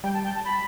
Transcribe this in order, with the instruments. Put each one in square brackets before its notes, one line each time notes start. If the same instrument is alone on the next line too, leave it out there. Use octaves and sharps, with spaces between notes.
[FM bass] G3 [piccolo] G5
[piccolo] A5
G5
A5
B5